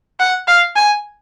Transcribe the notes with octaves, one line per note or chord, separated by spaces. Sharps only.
F#5
F5
G#5